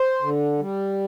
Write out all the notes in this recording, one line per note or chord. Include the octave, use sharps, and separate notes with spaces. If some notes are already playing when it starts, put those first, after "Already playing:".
Already playing: C5
D3
G3